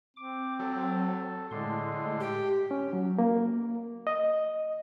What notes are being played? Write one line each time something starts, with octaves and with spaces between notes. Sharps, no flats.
C4 D6
F#3 A4
A2 D3 G#3 C6
G4
C#4
F#3
A#3
D#5